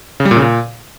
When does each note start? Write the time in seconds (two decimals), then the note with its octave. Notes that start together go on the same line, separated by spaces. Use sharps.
0.20 C#3
0.25 G3
0.31 A#2
0.36 C#3
0.42 A#2